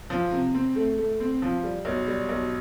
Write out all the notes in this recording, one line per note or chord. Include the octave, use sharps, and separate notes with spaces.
F3
C3
C4
A3
A3
C4
F3
G3
B1
G3
B1